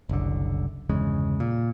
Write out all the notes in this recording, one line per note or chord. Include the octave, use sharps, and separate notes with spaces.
F#1 C2 D3
G1 E2 C#3 G#3
A#2